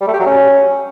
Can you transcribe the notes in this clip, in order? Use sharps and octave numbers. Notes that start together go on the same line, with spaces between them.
G3
A3
G4
F#3
C#4